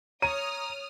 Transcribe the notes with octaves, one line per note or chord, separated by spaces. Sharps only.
C#5 A#5 D#6 F6 D#7